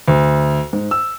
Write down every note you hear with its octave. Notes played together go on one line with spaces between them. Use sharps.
D2
G#2
E6